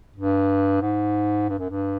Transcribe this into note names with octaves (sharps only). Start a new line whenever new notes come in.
G2
G#2
G2
F#2
G2